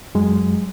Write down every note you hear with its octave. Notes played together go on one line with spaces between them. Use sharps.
F#2 F#3 G#3